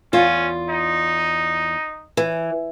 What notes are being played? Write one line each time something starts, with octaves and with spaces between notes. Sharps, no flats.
E2 C#4 F4
D#4
E3